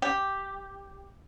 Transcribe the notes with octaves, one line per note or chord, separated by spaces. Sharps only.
G4